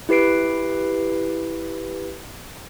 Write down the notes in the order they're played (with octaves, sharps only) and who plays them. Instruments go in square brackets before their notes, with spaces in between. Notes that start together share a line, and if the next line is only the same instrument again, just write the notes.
[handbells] E4 G4 B4 C7 D7